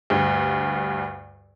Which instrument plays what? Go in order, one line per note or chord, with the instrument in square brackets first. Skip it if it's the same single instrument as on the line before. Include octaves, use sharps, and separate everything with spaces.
[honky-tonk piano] D2 G2